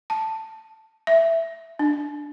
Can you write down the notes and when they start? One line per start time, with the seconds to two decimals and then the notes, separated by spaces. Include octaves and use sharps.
0.10 A5
1.07 E5
1.79 D4